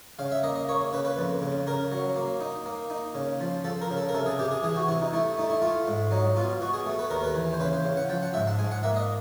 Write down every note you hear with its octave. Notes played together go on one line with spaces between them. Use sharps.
C#3 F5
E5
A#3 D#5
D#5
A#3 C#5
C#3 B4
B4
F2
C#3
C#3 A#4
F#3
A#3
D#4
A#3
D#4
C#3
F3
F3 A4
A#4
C#3
A4
A#4
C3 A4
G#4
C3 G4
G#4
E3 G#4
F#4
C3 E4
D#4
A3 E4
A3 D#4
E4
A3 F4
G#2
F#3 D#4
B2 F4
B2 F#4
G#4
A3
B4
D#2 A#4
B4
E3
C5
C#3 B4
C5
C#3
F#5
F3 G5
F#5
G#2 E5
A5
G#2 G#5
F#5
A#3 E5
D#5